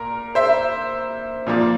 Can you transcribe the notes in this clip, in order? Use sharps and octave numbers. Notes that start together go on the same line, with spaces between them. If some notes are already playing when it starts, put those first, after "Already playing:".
Already playing: A#2 A#4
C5 E5
A#2 F3 A#3